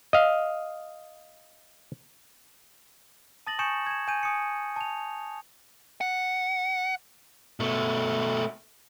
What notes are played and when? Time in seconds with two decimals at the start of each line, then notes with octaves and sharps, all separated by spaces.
0.13 D#5 F5
3.47 A5 D#6 A6 A#6 F#7
3.59 G#5 C#6 D#6 G6 C#7 E7
3.87 G#6 E7
4.08 G#5 G6 D#7
4.23 G#5 D#6 C#7
4.76 A5 F7
6.01 F#5
7.60 B2 A3